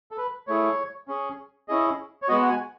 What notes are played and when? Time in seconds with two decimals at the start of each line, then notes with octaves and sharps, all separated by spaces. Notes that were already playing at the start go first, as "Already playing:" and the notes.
0.11 A4
0.18 B4
0.47 A3 E4 G#4 C#5
1.08 C#4 G#4
1.68 C#4 E4 G#4 D#5
2.22 C#5
2.28 G#3 B3 F#4 D#5
2.42 F#5
2.49 G#5